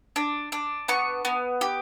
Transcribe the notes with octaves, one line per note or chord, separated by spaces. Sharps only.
D4
D4
B3 C#6
B3
G4